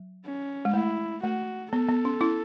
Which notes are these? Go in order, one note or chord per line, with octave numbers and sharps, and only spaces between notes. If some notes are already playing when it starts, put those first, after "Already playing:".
Already playing: F#3
C#4
G#3
A3 E4
A3 F#4
B3 A4
B3
C#4
C#4 E4